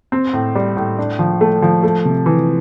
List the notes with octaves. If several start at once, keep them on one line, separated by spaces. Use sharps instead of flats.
C4
A2
G3
A2
D4
F3
A3
F3
A3
C3
E3